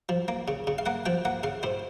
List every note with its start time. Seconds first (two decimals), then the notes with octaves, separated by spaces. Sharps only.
0.09 F3
0.28 A#3
0.48 C#3
0.67 C#3
0.78 F5
0.86 A#3 F#5
1.06 F3 G5
1.25 A#3 F#5
1.43 C#3 F5
1.63 A2 C5